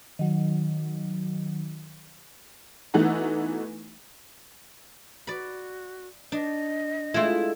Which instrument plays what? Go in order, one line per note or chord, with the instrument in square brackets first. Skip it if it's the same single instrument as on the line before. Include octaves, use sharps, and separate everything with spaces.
[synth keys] D#3 F#3
[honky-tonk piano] E3 A3 B3 D#4 F#4
[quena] F#4 [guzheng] D5 B5
[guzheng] D4 [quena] D#5
[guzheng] G#3 A3 [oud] E4 F4